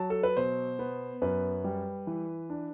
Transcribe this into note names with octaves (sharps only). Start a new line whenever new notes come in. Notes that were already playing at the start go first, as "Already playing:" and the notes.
Already playing: F#3 A5
A4
B4
B2 C5
B3
F#2 B4
G3
E3
D4